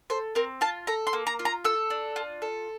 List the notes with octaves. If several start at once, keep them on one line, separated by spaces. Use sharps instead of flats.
A4 C5
C4 A#4
F4 A5
A4 A#5
C6
A#3
A#5
F4
A#5
A4 E6
D4
F4
A4